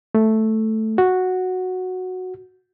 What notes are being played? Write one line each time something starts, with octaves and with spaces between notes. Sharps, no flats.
A3
F#4